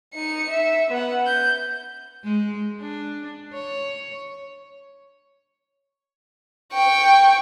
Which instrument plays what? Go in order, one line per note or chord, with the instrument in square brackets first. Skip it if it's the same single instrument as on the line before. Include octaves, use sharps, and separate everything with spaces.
[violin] D#4 C#7
E5
B3 F#5
G6
[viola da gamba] G#3
D4
C#5
[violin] G5 C#6